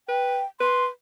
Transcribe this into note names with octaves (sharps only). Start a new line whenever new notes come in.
B4 G5
B4 C6